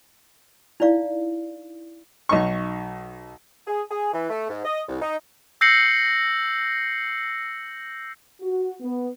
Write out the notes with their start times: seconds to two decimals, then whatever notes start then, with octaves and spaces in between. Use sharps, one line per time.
0.80 D#4 E4 D5 F5
2.29 B1 D#4 C#6
3.67 G#4
3.90 G#4
4.13 E3
4.30 A3
4.49 G#2
4.65 D#5
4.88 C2
5.02 D#4
5.61 E6 G6 A#6 C7 C#7 F#7
8.42 F#4
8.81 B3